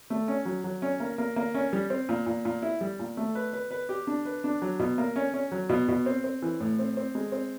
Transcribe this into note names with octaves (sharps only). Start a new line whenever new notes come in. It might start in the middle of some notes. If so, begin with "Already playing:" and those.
A3
C#4
F#3
F#3
C#4
A#3
A#3
A#3
C#4
G3
C4
A#2
A#2
A#2
E4
G3
A#2
A3
B4
B4
B4
G4
D4
B4
D4
F#3
B2
A#3
C#4
C#4
F#3
B2
B2
C4
C4
E3
A2
C4
C4
G#3
C4